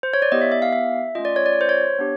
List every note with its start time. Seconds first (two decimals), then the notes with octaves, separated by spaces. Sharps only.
0.03 C5
0.13 C#5
0.22 D5
0.32 B3 E4 G4 D#5
0.41 E5
0.52 E5
0.62 F5
0.73 E5
1.15 A3 C#4 F4 D#5
1.25 D5
1.36 C#5
1.46 D5
1.53 C#5
1.61 C5
1.69 C#5
1.99 B3 D4 G4